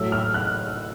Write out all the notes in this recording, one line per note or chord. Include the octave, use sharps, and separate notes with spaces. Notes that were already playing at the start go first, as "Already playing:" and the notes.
Already playing: A2 F#3 A3 E6
F6
F#6